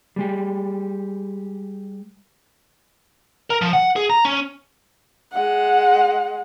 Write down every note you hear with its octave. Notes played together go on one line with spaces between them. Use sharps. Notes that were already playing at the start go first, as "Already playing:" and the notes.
G3 G#3 G4
A#4
F3
F#5
G#4
A#5
C#4
G#3 F#5